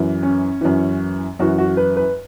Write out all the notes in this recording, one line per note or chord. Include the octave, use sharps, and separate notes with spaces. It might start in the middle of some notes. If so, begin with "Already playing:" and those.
Already playing: F#2 E3
C#4
F#2 E3
F#2 E3 F#4
F#4
B4
B4